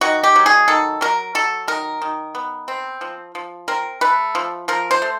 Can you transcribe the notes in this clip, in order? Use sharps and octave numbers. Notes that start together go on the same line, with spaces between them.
D#3 F#4
G4
F#3
G#4
D#3 A4
F#3 A#4
F#3 A4
D#3 A#4
D#3
B3
C4
F3
F3
C4 A#4
A3 B4
F3
F3 A#4
C5
A3